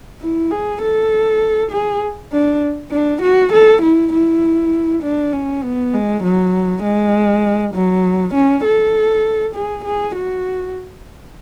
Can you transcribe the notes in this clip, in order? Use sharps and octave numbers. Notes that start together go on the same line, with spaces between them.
E4
G#4
A4
G#4
D4
D4
F#4
A4
E4
E4
D4
C#4
B3
G#3
F#3
G#3
F#3
C#4
A4
G#4
G#4
F#4